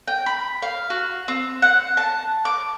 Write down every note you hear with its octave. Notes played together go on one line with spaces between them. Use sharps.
G5
B5
F5
F#4
C4
F#5
A5
D6